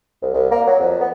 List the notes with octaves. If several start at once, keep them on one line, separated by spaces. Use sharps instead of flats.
C2
C2
A#3
F#3
F2
B3